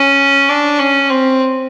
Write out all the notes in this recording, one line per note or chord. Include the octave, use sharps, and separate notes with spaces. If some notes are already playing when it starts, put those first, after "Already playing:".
Already playing: C#4
D4
C#4
C4